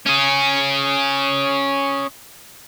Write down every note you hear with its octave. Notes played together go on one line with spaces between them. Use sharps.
C#4 G#4